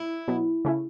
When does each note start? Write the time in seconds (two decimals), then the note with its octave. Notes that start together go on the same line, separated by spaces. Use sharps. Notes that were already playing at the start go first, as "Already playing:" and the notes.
Already playing: E4
0.28 B2 F#3 B3
0.65 C#3 A3 C#4 E4